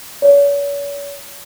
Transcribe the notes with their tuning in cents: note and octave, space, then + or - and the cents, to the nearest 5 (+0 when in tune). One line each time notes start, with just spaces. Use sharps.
C#5 +40